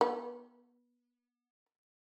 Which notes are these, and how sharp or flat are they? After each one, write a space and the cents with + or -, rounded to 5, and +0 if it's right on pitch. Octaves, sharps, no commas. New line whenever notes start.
B3 -25